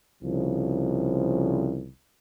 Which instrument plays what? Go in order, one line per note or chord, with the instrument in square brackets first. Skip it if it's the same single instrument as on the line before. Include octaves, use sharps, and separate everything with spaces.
[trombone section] C2 C#3 F3